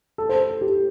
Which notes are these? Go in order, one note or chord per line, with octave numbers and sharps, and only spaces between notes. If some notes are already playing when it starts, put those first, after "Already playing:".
A4
C5
A4
G4